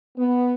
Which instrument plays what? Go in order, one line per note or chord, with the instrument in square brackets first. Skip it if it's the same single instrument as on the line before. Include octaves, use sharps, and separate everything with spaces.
[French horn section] B3